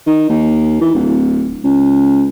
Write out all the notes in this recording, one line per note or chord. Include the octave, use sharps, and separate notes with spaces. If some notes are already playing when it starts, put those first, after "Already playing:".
D#3
D#2
E3
D1
C#2